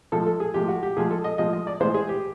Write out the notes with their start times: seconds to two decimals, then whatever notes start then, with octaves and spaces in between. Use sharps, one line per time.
0.12 A2 F3 G#3 A4
0.27 A4
0.40 G#4
0.54 A2 F3 G#3 G4
0.68 F#4
0.83 G4
0.96 A2 F3 G#3 G#4
1.11 A4
1.24 D#5
1.38 A2 F3 G#3 D#5
1.53 D#5
1.67 D5
1.80 A2 E3 G#3 C5
1.94 G#4
2.09 G4